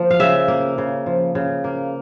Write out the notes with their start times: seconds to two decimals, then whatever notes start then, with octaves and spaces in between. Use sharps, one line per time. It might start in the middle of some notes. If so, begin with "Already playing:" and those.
Already playing: F3 A#3
0.11 F5
0.20 C#3 E5
0.48 A#3
0.78 C#3
1.06 F3
1.35 C#3
1.64 A#3